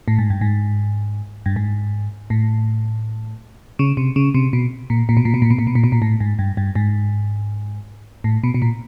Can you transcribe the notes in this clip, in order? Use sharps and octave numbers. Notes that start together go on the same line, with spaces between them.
A2
G#2
G2
G#2
G2
G#2
A2
C#3
C3
C#3
C3
B2
A#2
A#2
B2
A#2
B2
A#2
B2
A#2
B2
A#2
B2
A#2
A2
G#2
G2
G2
G#2
A2
B2
B2
A#2